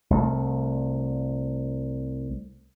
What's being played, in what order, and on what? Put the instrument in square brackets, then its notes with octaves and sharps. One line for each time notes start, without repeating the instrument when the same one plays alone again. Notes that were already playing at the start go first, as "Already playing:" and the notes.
[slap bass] C2 A3